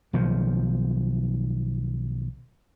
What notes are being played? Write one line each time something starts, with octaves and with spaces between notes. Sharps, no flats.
B1 D#3 F3